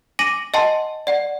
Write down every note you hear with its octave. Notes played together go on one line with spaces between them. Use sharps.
G#5 D6 A#6 D#7 F#7
D#5 F#5 G#5 A5 C6
D5 F#5